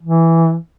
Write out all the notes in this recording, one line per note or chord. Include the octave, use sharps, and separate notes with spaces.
E3